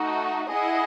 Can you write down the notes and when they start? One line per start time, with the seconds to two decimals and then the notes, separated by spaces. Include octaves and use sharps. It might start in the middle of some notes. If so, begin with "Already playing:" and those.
Already playing: A3 D#4 F#4
0.50 E4 G#4 D#5 F#5